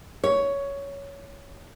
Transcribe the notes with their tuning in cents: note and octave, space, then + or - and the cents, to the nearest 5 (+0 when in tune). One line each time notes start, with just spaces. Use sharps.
C#5 +10